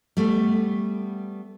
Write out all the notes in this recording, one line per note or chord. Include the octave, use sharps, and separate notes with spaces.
G3 A3 B3